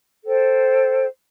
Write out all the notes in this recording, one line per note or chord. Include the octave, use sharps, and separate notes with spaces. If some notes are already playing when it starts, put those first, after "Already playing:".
A4 C5 G5